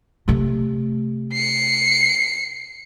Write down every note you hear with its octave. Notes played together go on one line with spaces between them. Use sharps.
C3 A3
C7 C#7